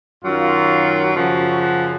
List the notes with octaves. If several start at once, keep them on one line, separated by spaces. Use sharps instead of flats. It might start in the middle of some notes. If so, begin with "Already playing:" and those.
F#2 D#3 F#3 F4
F#2 C#3 F3 F#4
F#4